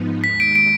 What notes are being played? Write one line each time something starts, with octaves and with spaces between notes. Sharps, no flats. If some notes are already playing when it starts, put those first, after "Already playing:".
Already playing: G#2 F3 B3 D#4
D#2 D#3 G#3 B6
D7
D7